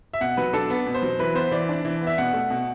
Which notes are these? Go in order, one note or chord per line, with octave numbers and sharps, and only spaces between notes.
E5
B2 F#5
F#3 B4
D4 A4
B3
B2
C5
F#3
E3 B4
B3 C5
E3 D5
D4
E3
B3
E5
B2 F#5
A3
B2